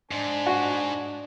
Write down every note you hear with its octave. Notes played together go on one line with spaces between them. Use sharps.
G#2 D4 G#5
F#4